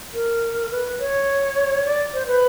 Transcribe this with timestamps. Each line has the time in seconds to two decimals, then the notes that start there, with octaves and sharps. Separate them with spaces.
0.14 A#4
0.71 B4
1.00 C#5
1.85 D5
2.14 C5
2.27 B4